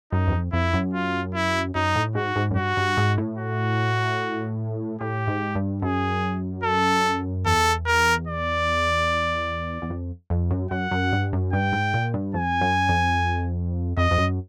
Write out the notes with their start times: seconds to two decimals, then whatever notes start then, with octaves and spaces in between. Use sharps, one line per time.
0.12 F#2 D#4
0.27 E2
0.32 F2
0.52 F2 E4
0.73 F#2
0.93 F4
1.34 E4
1.75 F#2 D#4
1.95 A2
2.15 G#2 F#4
2.36 G#2
2.51 F#2
2.56 G2 F#4
2.77 G2
2.97 G#2
3.18 A2
3.38 F#4
5.01 A2 G4
5.27 G#2
5.55 G2
5.82 F#2 G#4
6.64 A4
7.46 E2 A4
7.86 A#4
8.27 D5
9.82 E2
9.90 F2
10.30 F2
10.51 F#2
10.71 F#2 F#5
10.91 F#2
11.12 G2
11.33 F#2
11.53 G2 G5
11.73 G#2
11.94 A#2
12.14 G2
12.34 F2 G#5
12.61 F#2
12.89 F2
13.97 F2 D#5
14.11 F2
14.18 F#2